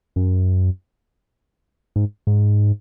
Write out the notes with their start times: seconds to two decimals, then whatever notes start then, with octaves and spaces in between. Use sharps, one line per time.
0.16 F#2
1.96 G#2
2.27 G#2